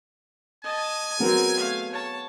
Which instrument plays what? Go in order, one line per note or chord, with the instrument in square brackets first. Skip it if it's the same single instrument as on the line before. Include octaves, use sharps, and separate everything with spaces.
[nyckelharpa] D#5 A5 [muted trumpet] G#5
[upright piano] F#3 B3 G#4 [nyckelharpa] C4 A#4
[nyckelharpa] A3 F5
C#5 A5